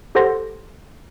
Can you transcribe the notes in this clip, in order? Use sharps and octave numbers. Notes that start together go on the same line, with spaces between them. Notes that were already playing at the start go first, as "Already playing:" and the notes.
G4 A4 C5 F#5 C6 A#6